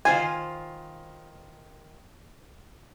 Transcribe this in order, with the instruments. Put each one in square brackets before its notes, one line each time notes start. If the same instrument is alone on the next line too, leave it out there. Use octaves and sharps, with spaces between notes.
[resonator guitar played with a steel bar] D#3 F4 C5 [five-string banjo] G#5